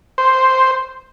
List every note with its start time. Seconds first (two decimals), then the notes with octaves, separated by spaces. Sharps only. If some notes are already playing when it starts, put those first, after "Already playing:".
0.18 C5